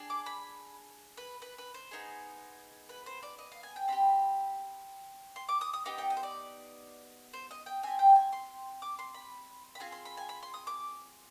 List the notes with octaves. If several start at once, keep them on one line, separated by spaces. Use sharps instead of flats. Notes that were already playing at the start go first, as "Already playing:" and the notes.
Already playing: D4 G#4
D6
B5
B4
B4
B4
C5
B3 D#4 G#4
B4
C5
D5
D#5
F5
G#5
G5
C4 D#4 G4 B5
C6
D6
D#6
D#6
B3 D#4 G4 D6
G5
D#5
C5
D5
C5
D#5
G5
C4 G4 G#5
G5
G#5
C6
D6
C6
B5
B5
C4 F4 G#4 G#5
C6
B5
G#5
B5
C6
D#6
D6